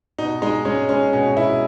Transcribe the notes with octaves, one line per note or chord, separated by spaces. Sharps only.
B2 D#4
G#3 D#4
G#3 C#4
G#3 C#4
B2 C#4
B2 E4